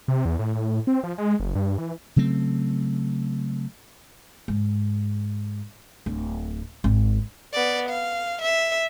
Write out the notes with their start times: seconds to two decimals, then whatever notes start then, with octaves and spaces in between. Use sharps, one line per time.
0.08 C3
0.25 E2
0.39 A2
0.55 A2
0.87 C4
1.04 F3
1.18 G#3
1.40 F#1
1.55 G2
1.78 E3
2.16 C#3 F#3 A3 C4
4.48 G#2
6.06 D1
6.84 G#1
7.53 B3 D5
7.89 F5
8.42 E5